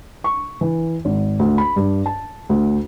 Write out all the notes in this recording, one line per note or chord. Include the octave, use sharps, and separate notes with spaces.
C#6
E3
G#1
D2
B5
G2
A5
D2